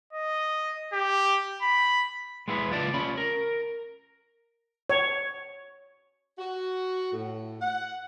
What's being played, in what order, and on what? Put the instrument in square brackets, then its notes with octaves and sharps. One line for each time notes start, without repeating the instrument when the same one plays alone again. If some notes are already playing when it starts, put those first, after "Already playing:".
[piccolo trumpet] D#5
G4
B5
[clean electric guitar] G#3 B3 E4 B4
C#2 F4 D5 A5
C#4 F4 B5
A#4
[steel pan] C#5
[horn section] F#4
A2
F#5